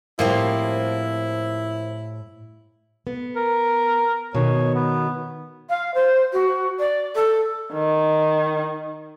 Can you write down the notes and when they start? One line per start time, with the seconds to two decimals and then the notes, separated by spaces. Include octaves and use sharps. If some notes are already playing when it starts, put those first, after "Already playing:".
0.19 A2 F3 G3 A#3 C4 E4
3.07 B3
3.36 A#4
4.35 B2 D#3 C#5
4.75 B3
5.69 F5
5.94 C5
6.33 F#4
6.79 D5
7.15 A4
7.73 D#3